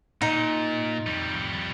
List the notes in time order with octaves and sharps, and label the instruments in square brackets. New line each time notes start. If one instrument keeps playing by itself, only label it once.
[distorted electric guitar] A#2 [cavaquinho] D#4
[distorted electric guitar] F2 G3